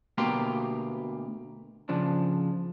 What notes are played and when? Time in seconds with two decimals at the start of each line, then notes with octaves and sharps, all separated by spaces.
0.18 D2 B2 A#3 G4 F5 C6
1.89 C#3 F3 D4